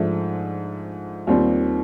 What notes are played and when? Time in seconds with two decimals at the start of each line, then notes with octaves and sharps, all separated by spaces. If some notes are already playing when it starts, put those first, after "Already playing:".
Already playing: G#2 F3 A3 D4
1.27 D#2 D#3 G3 C4 F4